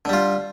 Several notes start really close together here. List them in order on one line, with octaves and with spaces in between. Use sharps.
D3 G3 F4